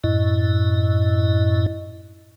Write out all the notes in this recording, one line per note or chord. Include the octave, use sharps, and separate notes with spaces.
F#2 A2 E4 D#5